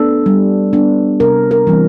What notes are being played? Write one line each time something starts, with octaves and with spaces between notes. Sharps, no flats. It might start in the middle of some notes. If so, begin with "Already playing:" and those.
Already playing: B3 D4 A4
G3
B3 D4
C3 A#4
A#4
E3 G3 C4